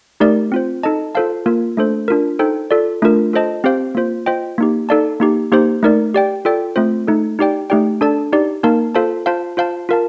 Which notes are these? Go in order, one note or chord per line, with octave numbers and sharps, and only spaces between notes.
A3 D#4 G4 A#4 D5
C4 F4 C5
D#4 A4 D#5 A5
F4 A4 C5 F5 A5
A#3 F4 A#4
A3 D4 A4 C5
D4 F4 A#4
D#4 A4 C5 G5
F4 A4 D5
A3 D4 F4 A#4
F4 A4 C5 D#5 A5
C4 G4 C5 F5
A#3 F4 C5
F4 C5 D#5 G5
A#3 D#4 G4
D#4 A4 D5 F5 A5
A#3 D#4 G4
A#3 D#4 G4 C5
A3 D#4 A#4 D5
G4 D5 G5
F4 A4 D5 G5
A3 C4 F4 C5
A3 D#4 A4
D#4 G4 D5 G5
A3 D#4 G4 D5 G5
D4 A4 D5 A5
D#4 G4 D5
A#3 D#4 A#4 F5 A5
F4 A4 C5 F5 A5
F4 C5 F5 A5
F4 C5 F5 A5
F4 A#4 F5 A5